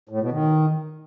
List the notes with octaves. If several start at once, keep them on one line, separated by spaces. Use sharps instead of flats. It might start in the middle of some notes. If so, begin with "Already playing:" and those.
A2
B2
D#3